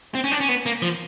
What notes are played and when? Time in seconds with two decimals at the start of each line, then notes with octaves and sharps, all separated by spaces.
0.15 C4
0.24 C#4
0.32 D4
0.41 C#4
0.49 B3
0.66 A#3
0.82 F3